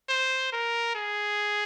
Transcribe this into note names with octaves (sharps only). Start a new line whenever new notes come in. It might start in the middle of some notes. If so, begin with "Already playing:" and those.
C5
A#4
G#4